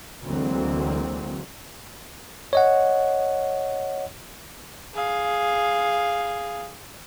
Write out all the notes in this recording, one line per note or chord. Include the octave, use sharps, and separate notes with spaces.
D2 E3 F#3 G#3 A#3 C4
C#5 D#5 F#5
G#4 F5